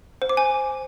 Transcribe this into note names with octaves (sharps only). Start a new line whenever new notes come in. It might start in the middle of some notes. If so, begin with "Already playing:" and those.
C5
D6
G#5